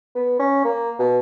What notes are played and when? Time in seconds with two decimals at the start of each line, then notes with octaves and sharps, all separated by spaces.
0.15 B3
0.39 C#4
0.64 A#3
0.99 B2